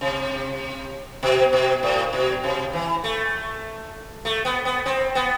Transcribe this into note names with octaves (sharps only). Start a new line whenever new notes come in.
C3
B2
B2
A2
B2
C3
E3
A3
A3
B3
B3
C4
B3